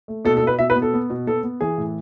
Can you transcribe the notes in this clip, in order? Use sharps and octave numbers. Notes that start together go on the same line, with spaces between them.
A3
B2 A4
A4
B2 B4
B2 E5
B4
B3
A4
B3
B2
B3 A4
B3
E3 G#4
A2